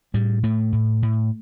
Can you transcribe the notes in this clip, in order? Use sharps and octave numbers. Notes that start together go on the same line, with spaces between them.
A2 G3
A2 A3
A2
A2